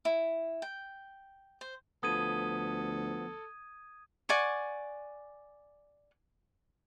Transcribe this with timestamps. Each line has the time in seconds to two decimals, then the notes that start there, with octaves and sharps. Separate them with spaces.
0.05 E4
0.62 G5
1.61 C5
2.03 D2 F3 B3 A4 D#6 G#6 D#7
4.29 D5 F#5 G#5 C#6